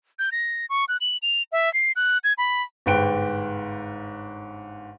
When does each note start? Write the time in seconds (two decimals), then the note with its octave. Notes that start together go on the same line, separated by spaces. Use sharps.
0.19 G6
0.32 A#6
0.70 C#6
0.88 F#6
1.01 F#7
1.22 F7
1.52 E5
1.74 C7
1.96 F#6
2.24 G#6
2.38 B5
2.86 G1 G#2 B4 G5 D7